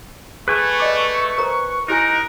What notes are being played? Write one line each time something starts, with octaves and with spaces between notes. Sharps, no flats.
A3 G#4 B4 G#5 C#6
D5 D#5 D6
A#4 C5 A#5
D#4 E4 G4 A#4 G#5 F#6